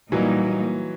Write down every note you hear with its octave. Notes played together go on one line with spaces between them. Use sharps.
A#2 E3 F#3 G3 A#3 D#4